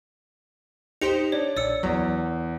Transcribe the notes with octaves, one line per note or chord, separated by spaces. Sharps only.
D#4 G4 C5 C#7 F7
D4 C#5
A#1 D5 E6 C#7
E2 F#3